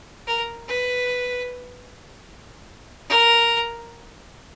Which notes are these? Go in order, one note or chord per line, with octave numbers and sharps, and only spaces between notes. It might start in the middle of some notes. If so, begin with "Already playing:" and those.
A#4
B4
A#4